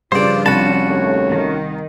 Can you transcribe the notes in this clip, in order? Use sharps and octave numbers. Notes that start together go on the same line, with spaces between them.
G2 C#3 F3 D4 F4 C5 D5
C2 C#4 F#4 A5 B5
D#2 A3 C#5
D#3